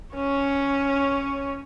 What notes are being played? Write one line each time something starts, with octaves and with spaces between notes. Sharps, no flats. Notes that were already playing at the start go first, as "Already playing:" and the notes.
C#4 C#5